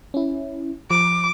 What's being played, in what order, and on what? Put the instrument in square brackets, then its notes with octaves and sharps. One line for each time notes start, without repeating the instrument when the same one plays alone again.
[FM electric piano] C#4 E4
[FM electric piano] F3 [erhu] D6